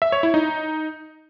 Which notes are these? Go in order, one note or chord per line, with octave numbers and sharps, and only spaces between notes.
E5
C#5
E4
D#4